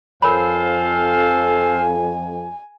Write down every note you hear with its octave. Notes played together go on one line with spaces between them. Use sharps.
F2 A4 A#4 C5 C#5 F5 G#5 B5